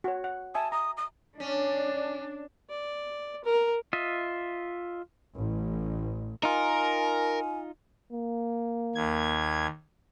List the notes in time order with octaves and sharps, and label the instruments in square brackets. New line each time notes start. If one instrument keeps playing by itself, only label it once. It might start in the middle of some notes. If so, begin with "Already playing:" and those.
[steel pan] F#4 C#5
F#5
[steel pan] E5 G#5 D#6 [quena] A5
[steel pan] A#5 [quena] D#6
[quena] D#6
[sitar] C#4 [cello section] D4
[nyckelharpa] D5
A#4
[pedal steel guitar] F4 D#5 E5
[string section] A1
[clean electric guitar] D#4 F4 [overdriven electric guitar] A#4 [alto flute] G#5
[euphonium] A#3
[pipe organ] D#2 G#6